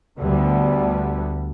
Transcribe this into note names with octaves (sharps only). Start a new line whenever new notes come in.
D2 D3 G3 B3